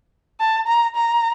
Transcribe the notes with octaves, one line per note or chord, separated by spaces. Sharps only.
A5
A#5
A#5